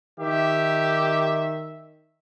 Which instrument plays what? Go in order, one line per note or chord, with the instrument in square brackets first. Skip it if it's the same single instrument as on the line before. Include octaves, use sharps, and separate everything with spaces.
[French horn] D#3 [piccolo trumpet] G4 [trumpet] E5